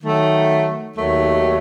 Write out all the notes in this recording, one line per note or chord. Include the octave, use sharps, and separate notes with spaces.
D#3 F#3 A3
D#2 D#3 F#3 A3